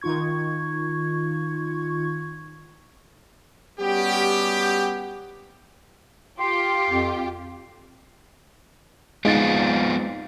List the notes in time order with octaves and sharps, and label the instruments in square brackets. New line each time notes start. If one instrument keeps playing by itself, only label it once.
[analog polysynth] D#3 D#4 F4 C#6 G#6
[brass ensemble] G3 B3 C#4 F#4 G4
[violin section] F4 G4 [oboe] C6
[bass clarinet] F2
[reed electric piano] G#3 D#4 A6 [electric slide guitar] B3 C4 F4